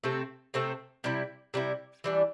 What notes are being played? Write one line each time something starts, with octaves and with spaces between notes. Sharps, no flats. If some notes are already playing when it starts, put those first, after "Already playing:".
C3 A3 C4 A4
C3 A3 C4 A4
C3 G3 E4
C3 G3 E4
E3 G3 D4